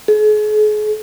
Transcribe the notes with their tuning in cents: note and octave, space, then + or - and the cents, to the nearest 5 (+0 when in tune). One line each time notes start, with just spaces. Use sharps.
G#4 +40